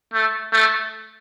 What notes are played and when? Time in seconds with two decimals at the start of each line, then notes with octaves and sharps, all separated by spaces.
0.14 A3
0.53 A3